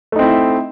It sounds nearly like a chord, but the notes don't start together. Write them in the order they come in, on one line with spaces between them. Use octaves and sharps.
A3 D#4 C4 E4